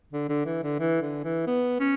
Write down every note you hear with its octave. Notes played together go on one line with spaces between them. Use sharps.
D3
D3
E3
D3
E3
D3
E3
B3
C#4